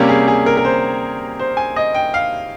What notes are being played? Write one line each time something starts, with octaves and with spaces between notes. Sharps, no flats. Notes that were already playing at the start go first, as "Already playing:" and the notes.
Already playing: C3 G3 A#3 C#4 G4
G#4
G#4
A#4
A#4
C5
C5
G#5
D#5
G5
F5